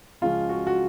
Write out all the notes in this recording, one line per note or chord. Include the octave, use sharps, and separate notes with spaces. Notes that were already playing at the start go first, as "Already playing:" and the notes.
C#2 C#3 F3 G#3 C#4 F4
F#4
F#4